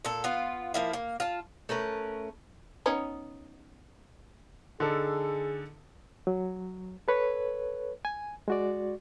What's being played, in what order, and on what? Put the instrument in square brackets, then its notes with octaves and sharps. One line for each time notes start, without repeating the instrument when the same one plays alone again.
[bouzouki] A#2 A4
B3 F4
F3 A#3 E4
A#3
F4 A5
A3 C#4 A#4 B4
[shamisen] B3 C#4 D#4
[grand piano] D3 D#4 A4 [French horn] G#4
[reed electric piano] F#3
A4 B4 C#5
G#5
G#3 F#4 D5